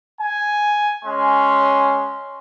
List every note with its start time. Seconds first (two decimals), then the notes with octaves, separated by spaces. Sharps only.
0.21 G#5
1.05 G#3 C#4 C6